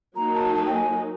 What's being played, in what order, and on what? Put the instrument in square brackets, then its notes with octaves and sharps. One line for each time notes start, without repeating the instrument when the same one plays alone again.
[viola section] F#3 A#3 D#4 [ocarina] A#5
[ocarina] A5
A5
G5
G#5